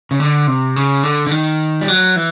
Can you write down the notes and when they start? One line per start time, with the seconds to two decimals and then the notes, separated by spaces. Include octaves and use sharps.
0.11 C#3
0.20 D3
0.47 C3
0.76 C#3
1.03 D3
1.27 D3
1.31 D#3
1.81 G3
1.88 F#3
2.16 E3